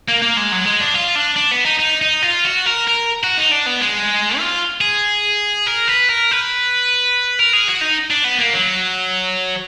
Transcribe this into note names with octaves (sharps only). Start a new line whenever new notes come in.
A#3
A#3
G#3
F#3
G#3
D4
F4
D4
D4
B3
D#4
D#4
D#4
F4
F#4
A#4
A#4
F#4
D#4
D4
B3
G#3
F4
G#4
A#4
B4
A#4
B4
A#4
G#4
F#4
D#4
D4
B3
A#3
F#3